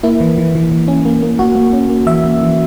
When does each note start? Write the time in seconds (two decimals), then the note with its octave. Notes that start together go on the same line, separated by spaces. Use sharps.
0.03 A#3 E4
0.21 E3
0.38 E3
0.55 E3
0.72 E3
0.88 C#4
1.05 A#3
1.22 A#3
1.39 A#3 F#4
1.56 A#3
1.73 C#4
1.89 A#3
2.06 E3 E5
2.24 A#3
2.41 E3